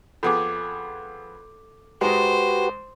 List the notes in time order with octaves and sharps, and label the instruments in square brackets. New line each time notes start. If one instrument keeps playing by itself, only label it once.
[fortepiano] F2 B3 G#4 [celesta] A4 D6
[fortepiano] G#2 G#3 [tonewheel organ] F#4 G4 B4 [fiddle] C5